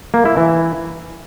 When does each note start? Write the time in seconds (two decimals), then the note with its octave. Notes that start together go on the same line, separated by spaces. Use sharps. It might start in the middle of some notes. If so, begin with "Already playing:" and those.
0.14 A#3
0.25 E4
0.37 E3